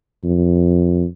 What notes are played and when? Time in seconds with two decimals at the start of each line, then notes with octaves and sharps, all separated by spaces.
0.24 F2